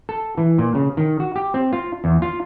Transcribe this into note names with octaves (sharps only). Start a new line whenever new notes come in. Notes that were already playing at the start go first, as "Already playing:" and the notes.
A4
E3
A#2
C#3
D#3
F#4
G4
C4
F4
E2
F4